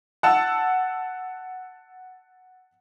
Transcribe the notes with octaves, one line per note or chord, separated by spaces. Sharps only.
F#5 A5 E6